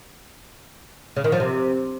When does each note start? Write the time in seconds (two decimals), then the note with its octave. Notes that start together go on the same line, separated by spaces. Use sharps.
1.16 C#3
1.24 D#3
1.32 F3
1.40 C3